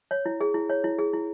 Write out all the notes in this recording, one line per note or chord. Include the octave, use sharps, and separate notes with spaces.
C#5
E4
G#4
E4
C#5
E4
G#4
E4